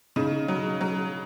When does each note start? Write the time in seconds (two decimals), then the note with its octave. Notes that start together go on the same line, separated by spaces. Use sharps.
0.16 C#3 D#4
0.48 F#3
0.81 F#3